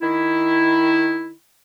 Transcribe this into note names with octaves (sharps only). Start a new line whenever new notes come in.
D#3 E4